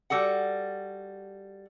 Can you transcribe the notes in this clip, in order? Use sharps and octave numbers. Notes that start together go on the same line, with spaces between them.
G3 F#4 A4 F#5